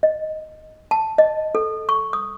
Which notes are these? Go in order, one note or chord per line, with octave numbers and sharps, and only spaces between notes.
D#5
A5
D#5
A4
C#6
D#6